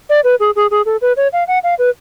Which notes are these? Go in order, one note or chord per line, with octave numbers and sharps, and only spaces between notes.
D5
B4
G#4
G#4
G#4
A4
B4
C#5
F5
F#5
F5
B4